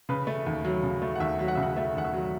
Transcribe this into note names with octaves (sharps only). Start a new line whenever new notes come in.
C#3 B4
A3
D#2
F#3
C#3
A3
F#5
D#2 E5
F#3
F#5
C#3 E5
F#5
A3 E5
D#2 F#5
E5
F#3